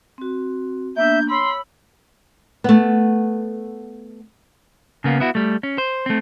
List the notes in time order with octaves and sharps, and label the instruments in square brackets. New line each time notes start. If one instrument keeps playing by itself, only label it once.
[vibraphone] C4 F#4
[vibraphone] A#3 B3 D4 [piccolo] E5 [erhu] G6
[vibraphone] C#5 E6 [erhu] B5 [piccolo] C6
[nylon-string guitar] A3 B3
[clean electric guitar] C#3 A#3 B3
B3 E4 F#4
G3 A3
C#4
C5
A3 C4